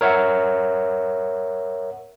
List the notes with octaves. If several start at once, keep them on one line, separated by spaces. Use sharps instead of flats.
A#4 C#5 E5 F#5